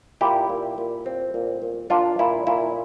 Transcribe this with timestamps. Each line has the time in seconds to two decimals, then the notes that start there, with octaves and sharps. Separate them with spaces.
0.21 A#2 E4 G4
0.50 A#2
0.78 A#2
1.06 C4
1.34 A#2
1.62 A#2
1.90 A#2 D4 F4
2.19 A#2 E4
2.47 A#2 E4